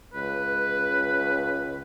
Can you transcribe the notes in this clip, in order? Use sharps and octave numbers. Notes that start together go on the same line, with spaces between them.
C#2 B4